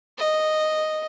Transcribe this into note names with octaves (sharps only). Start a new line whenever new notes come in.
D#5